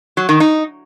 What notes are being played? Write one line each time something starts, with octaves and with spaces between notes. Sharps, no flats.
F#3
D#3
D#4